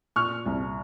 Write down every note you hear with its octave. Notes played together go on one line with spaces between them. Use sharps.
A#2 C#6 F6
C2